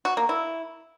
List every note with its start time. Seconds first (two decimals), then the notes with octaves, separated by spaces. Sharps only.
0.05 F#4
0.17 A#3
0.29 E4